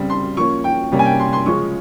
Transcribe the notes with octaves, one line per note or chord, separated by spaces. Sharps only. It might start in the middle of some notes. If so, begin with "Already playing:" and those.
Already playing: C#3 G3 C4
C6
F3 A#3 C#4 C#6
G5
C3 G3 A#3 C#4
G#5
G5
C6
C6
C#3 F3 G#3 C#4 C#6